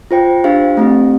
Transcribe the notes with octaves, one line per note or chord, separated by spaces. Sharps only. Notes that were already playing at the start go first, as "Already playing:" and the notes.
F4 C5 G5
D4 G4 C5 F5
A3 C4 G4